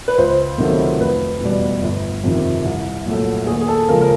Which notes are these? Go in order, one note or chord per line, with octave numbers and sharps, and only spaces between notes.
B4
C#2 C5
C3 D#3 F#3 A3
F1 B4
E2 B2 G3
G1
F2 C3 D#3
C2
A#2 F#3 A3
D#2 G#4
G#4
A4
C#3 F3 G#3 A#4
A#4